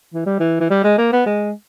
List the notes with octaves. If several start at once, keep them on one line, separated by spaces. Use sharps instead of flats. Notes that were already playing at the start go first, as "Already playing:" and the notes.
E3
G3
E3
E3
G3
G#3
A#3
B3
G#3